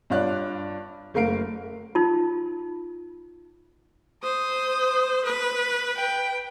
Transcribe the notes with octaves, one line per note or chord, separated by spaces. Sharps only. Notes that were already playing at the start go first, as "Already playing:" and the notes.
G2 F4 C#5 D5 F#6
F#1 A3 A#4 F5 C7 D7
D#4 F4
C5 D#6
B4
G5